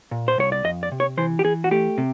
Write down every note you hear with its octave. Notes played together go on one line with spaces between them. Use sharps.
A#2
C5
C2 C#5
D5
F2 D#5
D5
C3
C#5
E3 C5
G4
E3 G#4
F#4
A3 G4
C3